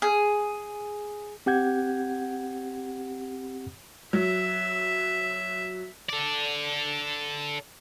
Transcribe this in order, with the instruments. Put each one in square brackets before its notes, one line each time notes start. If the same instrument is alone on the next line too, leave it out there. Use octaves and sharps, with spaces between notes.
[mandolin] G#4
[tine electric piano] C4 G4 F#5 G6 G#6
[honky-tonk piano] F#3 [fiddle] E5
[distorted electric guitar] A4 D5